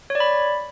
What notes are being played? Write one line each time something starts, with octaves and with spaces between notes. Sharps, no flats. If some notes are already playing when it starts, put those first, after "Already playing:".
C#5
D5
B5